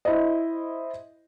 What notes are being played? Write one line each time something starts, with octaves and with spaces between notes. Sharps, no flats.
E4 C5 D#5